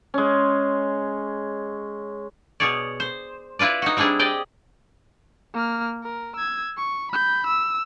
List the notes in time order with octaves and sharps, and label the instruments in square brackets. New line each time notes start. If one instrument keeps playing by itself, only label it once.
[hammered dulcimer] G#3 C#4
[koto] B2 G#4 C#5 D5
C5
E4 F4 B4 D5
D#4 F#4
G3 C4 D4 E4 G#4
G4 G#4 D5 D#5 G5
[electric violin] A#3 F6
A#4
E6 G#6
C#6
B5 G6
E6